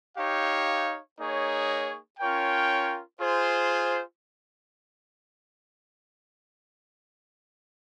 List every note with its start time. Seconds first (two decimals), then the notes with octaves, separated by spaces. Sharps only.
0.17 D#4 G4 C#5 F5
1.18 A#3 D#4 G#4 C#5
2.19 C#4 F4 A#4 C#5 G5
3.20 F4 G#4 C5